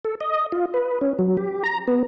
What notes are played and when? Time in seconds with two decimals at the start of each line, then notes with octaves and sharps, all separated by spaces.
0.05 A4
0.21 D#5
0.52 F4
0.74 B4
1.01 C#4
1.19 F#3
1.37 G4
1.64 A#5
1.88 B3